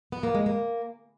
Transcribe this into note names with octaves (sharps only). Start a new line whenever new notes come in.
B3
A#3
G#3
A#3